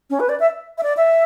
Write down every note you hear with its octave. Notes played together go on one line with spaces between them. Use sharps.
C#4
B4
D5
E5
E5
D5
E5